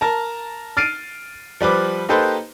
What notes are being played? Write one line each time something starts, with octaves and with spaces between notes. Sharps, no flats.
A#4 A5 A#5
F6 A6 C7 D7 D#7
F3 G3 B4 D6
A#3 D#4 G4 A4 B4 C5